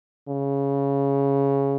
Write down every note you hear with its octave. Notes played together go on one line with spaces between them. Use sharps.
C#3